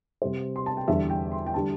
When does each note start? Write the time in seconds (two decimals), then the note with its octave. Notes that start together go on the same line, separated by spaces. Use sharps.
0.22 C3 G3 C5
0.56 C6
0.66 A5
0.77 G5
0.88 E2 D3 G3 E5
1.10 G5
1.32 C6
1.47 G5
1.54 D3 G3 A5